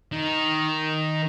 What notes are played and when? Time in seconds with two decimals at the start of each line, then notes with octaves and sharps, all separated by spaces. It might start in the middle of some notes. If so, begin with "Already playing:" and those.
0.12 D#3